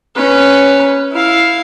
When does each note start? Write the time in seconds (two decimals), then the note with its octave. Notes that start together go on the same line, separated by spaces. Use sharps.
0.16 C#4 B4
1.12 E4 F5